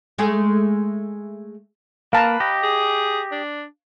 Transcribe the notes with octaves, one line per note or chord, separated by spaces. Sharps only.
G#3 A3 G#4
A#3 B4 F5 A5 A#5
G4 D#5
G#4
D4